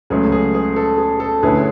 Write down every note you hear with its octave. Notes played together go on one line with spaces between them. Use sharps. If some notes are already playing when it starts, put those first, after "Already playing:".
C#2 C#3 F#3 A3 G#4
G#4
G#4
A4
G#4
A4
D2 D3 A3 C#4 E4 G#4 B4